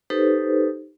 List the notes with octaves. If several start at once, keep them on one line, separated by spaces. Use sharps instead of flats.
D#4 G4 A4 B4 C5